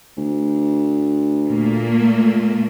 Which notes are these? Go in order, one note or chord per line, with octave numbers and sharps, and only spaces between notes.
D2
A#2 A3 A#3